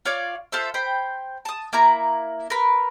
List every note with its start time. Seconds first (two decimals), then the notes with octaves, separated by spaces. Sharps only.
0.05 F4 C#5 D5 F5
0.52 F4 A4 C5 E5
0.74 C5 G5 B5
1.45 A5 D#6
1.73 A#3 E4 A#5
2.50 A#4 B4 B5